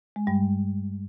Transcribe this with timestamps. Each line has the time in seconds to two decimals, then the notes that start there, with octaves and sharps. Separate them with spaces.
0.16 G#3
0.27 G2 G3